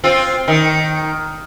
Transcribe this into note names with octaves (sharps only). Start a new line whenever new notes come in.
C4 F4
D#3